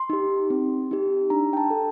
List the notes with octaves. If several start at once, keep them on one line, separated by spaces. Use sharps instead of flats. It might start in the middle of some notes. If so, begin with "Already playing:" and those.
Already playing: C6
D#4 G4
C4
D#4 G4
D4 A#5
G5
A5
A4